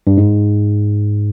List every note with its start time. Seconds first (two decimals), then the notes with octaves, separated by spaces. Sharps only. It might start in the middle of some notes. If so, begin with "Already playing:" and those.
0.07 G2
0.17 G#2